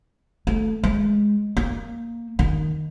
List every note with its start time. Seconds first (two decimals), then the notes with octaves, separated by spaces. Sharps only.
0.47 A3
0.84 G#3
1.57 A#3
2.39 D#3